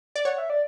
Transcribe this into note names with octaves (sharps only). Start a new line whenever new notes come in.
D5
C#5 F#5
E5
D5